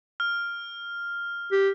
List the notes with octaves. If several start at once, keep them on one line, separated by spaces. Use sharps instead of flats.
F6
G4